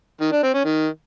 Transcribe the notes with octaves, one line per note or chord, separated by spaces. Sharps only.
D#3
D4
C4
C#4
D#3